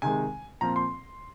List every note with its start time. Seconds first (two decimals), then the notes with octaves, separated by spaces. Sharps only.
0.02 C3 D#3 G#3 G#5
0.61 A#2 F3 C4 A#5
0.76 C6